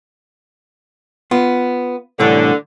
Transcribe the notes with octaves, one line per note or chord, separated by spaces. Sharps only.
B3 F4
C2 A2 D3 E3